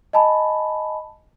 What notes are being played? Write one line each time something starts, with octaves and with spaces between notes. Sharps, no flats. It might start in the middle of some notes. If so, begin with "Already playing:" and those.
D#5 G#5 A5 B5